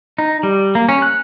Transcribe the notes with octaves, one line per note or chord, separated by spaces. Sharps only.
D#4
G3
A#3
C#4
F#6